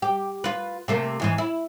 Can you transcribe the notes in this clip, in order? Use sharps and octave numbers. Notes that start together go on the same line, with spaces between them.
G4
F4 B4
C3 A3 A#3
E2 G#2 E3
E4